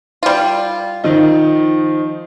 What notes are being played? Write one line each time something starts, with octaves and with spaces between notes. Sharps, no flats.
G3 F4
D#3 F3 D#4